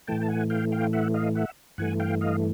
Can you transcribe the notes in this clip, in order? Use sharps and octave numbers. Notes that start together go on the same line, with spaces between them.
A2 E3 A3 G5 A5
A5
F#5 G#5
F5 G5
F5 G5
E5 F#5
D#5 F5
E5 F#5
G2 E3 A3 F#5 G#5
F5 G5
D#5 F5